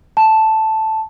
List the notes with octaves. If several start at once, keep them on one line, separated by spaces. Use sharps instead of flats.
A5